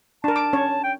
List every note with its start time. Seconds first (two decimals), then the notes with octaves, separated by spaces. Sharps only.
0.24 D4 A#4 A5
0.36 D6
0.53 C#4 C#5
0.84 G5